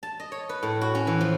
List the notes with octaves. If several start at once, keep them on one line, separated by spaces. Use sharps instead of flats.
A5
D#5
C#5
B4
A2
F#4
C#4
E3
F3